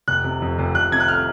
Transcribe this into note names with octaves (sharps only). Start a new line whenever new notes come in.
F1 F#6
C3
F2
F1
F1 F#6
C3 G#6
F#6
F6